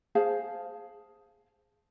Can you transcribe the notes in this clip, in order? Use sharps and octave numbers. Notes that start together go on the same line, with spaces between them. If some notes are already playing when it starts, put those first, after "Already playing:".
G#4 C5 F5 A5